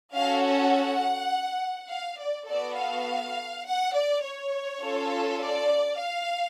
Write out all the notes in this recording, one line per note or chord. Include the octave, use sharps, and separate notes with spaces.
C#4 F#4 A4 F5
F#5
F5
D5
B3 F#4 A4 D5
F5
F#5
D5
C#5
C#4 F4 A4
D5
F5